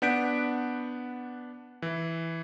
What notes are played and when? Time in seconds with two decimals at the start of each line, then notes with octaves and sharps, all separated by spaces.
0.02 B3 D4 F#5 G6 B6 D7
1.82 E3